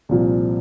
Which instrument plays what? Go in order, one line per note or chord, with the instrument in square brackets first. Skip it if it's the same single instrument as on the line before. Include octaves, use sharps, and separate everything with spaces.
[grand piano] C2 A#2 F3